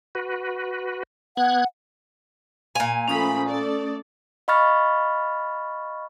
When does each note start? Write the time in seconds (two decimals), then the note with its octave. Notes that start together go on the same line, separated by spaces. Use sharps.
0.15 F#4 B4
1.37 B3 F#5 F#6 G#6
2.75 A#2 F5 G#5
3.08 F3 A3 C#4 B5 D#6
3.46 A3 A4 D5
4.48 D#5 F5 B5 C#6 F6 A6